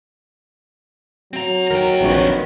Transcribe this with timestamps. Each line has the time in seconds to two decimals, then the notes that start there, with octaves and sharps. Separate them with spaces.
1.33 F#3 C4 A#5
1.70 D#2 D#4 A#4 G5
2.01 A#1 D#3 C4 B4 C#5